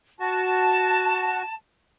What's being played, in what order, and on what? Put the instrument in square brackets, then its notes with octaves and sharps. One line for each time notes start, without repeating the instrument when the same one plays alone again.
[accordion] F#4 [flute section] A5